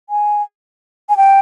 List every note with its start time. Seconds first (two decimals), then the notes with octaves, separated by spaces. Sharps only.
0.10 G#5
1.09 G#5
1.17 G5